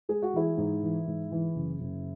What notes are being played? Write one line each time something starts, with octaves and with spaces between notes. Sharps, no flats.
G#3 G#4
F#4
E3 E4 G#4
G#2
E3
G#2
E3
F#1
F#1